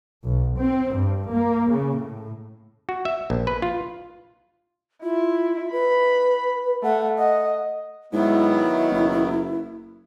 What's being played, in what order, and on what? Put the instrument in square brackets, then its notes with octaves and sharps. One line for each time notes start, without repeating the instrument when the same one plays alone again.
[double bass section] B1
C4
G2
A#3
C#3
A2
[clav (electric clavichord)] F#4
E5
A#1
B4
F4
[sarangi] E4 [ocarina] F4
[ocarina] B4 [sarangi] B5
[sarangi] A3 [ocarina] F#5
[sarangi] D#5 [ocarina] F#5
[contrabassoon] G#2 [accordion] D#3 F#3 B3 [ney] E4
[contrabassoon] F#1